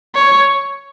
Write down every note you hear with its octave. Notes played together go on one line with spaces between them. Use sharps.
C#5